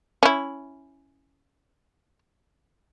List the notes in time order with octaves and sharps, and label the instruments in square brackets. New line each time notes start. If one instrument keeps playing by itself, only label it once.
[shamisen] C#4 E4